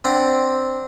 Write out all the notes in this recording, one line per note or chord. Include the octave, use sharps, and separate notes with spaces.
C4 D4 F#5 A#5